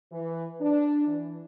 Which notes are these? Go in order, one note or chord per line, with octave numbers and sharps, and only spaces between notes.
E3
D4
E3